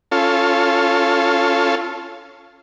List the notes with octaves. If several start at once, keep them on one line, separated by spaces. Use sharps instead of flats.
C#4 F4 A4